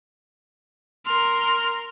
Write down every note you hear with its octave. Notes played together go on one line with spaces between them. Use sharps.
A#4 C6 F6